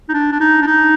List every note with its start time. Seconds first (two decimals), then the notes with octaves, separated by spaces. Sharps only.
0.09 D#4
0.14 D4
0.32 D4
0.40 D#4
0.62 D4
0.67 D#4